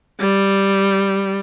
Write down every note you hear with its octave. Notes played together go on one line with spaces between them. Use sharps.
G3